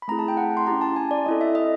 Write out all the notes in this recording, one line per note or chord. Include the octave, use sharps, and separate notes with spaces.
B5
A3 C4 E4 G#4 A#5
A5
G5
F#5
C6
C#4 E4 G4 A#5
A5
G#5
D5
C4 E4 A4 D#5
E5
D#5